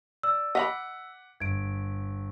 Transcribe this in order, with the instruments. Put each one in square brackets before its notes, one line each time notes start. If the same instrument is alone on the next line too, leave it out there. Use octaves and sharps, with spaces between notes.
[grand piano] D5 [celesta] E6
[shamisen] D#5 F5 B5 [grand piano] F#5 D6 B6
[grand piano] G1 [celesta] G#6 D7